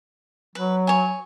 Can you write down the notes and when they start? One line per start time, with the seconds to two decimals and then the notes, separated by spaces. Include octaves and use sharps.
0.55 F#3 B4
0.87 C#5 G#5